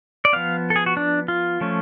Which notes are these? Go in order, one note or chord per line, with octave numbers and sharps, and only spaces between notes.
D5
F3 B3 F5
A4
G#4
F#4
D4
F4
F3 A3 C#4